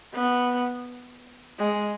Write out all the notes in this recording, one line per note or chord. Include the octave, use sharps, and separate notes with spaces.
B3
G#3